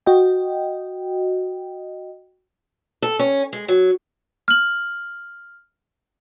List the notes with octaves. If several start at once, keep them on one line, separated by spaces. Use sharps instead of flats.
F#4 D#5 G5
A4
C#4
G#3
F#3
F6 F#7